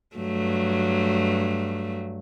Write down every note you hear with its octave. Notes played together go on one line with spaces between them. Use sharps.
G2 F#3 A3